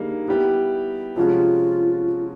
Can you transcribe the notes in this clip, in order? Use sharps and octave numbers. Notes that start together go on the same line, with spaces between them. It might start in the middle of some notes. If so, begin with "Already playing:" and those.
Already playing: D3 G3 A#3 D#4 G#4
G3 B3 E4 G4
C3 F3 G#3 C#4 F4 F#4